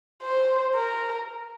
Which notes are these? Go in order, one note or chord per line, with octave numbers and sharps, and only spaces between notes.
C5
A#4